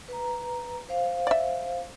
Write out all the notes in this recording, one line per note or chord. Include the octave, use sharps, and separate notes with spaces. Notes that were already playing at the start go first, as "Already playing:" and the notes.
B4 A#5
C5 F5
D5 E5